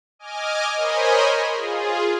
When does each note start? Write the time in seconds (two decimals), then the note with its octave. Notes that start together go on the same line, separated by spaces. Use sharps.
0.19 D#5 G#5 D6 F6
0.75 A#4 C5 C#5 D#5 G#5 B5
1.53 F4 G#4